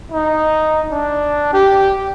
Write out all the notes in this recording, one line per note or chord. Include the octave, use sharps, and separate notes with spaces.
D#4
D4
G4